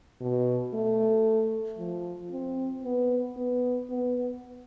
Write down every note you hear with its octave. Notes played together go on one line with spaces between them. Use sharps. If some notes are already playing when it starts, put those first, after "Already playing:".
B2
A3
F3
C4
B3
B3
B3